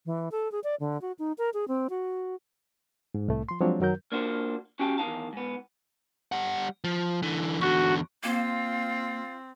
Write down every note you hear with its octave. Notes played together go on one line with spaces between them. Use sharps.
E3
A4
G#4
D5
D3
F#4
D#4
A#4
G#4
C4
F#4
G#2
C2 A2 A3
F3 C6
F3 F#3 G#3 C4 D4 C#5
F#2 D#3 F#3 A#4 G6
A#3 D4 F4 F#4 C5
C#4 F#4 G4 F5 G5 A5
E2 D#3 D#4 F5 A5
G#2 B3
G3 F#5
F3
D3 E3
E2 D3 F#4
A#3 C4 F4